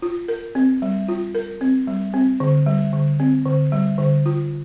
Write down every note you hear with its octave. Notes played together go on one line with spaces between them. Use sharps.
F4
A#4
C4
G3
F4
A#4
C4
G3
C4
D3
G3
D3
C4
D3
G3
D3
F4